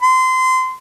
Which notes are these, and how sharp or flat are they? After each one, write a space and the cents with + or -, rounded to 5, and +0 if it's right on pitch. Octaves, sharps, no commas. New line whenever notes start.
C6 -25